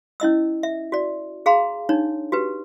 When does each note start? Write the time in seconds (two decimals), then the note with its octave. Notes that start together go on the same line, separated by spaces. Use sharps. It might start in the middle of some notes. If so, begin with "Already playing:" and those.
0.20 C#4 E4 D#5 E6
0.63 E5
0.92 F#4 D5
1.46 G#4 F5 A#5 C6
1.89 D4 D#4 C#5
2.32 F#4 G4 B4